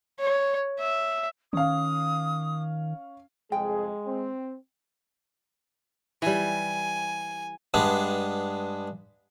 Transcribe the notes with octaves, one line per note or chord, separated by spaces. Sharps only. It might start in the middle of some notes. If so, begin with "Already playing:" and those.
C#5
E5
D#3 C#4 F5 D#6
C2 F2 G#3 G#4 G5
C4
E3 G3 G#5
G2 G#3 B3 D4